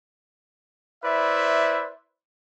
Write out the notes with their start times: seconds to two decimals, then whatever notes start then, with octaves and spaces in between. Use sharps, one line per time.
1.04 E4 B4 C5 D5 E5